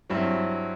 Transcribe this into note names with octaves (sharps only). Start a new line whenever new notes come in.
G2 F#3 C4 E4